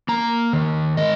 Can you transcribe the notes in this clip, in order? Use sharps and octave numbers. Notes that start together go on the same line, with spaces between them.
A#3 A#5
D#3
G#3 D#5